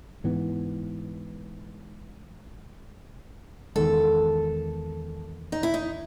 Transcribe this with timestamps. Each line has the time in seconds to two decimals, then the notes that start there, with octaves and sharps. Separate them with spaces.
0.24 G#2 E3 B3
3.76 E2 D#3 G#3 A4
5.52 D#4
5.63 E4
5.74 D#4